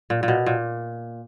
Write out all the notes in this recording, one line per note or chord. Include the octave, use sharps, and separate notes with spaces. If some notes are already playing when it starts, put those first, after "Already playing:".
A#2
A#2
B2
A#2